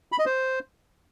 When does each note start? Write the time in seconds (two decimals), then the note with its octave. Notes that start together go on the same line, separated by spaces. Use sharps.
0.12 B5
0.19 D#5
0.26 C5